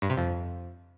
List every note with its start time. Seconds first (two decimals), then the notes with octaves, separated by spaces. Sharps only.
0.02 G2
0.10 C3
0.17 F2